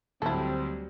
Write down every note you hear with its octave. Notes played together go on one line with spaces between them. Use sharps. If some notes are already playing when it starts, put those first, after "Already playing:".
D2 F#3 G3 C4 E4 A4